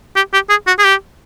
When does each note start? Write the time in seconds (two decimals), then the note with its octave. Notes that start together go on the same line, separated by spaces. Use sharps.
0.16 G4
0.33 G4
0.49 G#4
0.67 F#4
0.79 G#4
0.84 G4